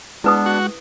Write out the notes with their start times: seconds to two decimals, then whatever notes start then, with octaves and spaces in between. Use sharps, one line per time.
0.24 G#3 B3 D4 E4 B4 D#6
0.46 F#4